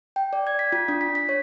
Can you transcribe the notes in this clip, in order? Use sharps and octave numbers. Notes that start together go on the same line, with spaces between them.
G5
D5
G#6
B6
F4
D4
B6
B6
C#5